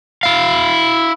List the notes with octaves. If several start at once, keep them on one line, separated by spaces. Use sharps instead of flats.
E4 F5